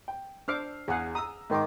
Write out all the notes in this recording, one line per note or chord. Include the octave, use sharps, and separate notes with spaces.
G5
D4 C5 D6 E6 F6 C7
E2 G#4 F5 F#5
A#5 D#6 E6
G#2 D#3 C6 D6